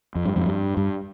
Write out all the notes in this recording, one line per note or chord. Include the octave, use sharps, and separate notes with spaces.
F2
G2
F2 G#2
G2
G2